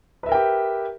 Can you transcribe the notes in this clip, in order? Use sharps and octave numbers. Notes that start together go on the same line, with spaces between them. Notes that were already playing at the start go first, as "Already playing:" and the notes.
G4 A#4 B4 E5 G5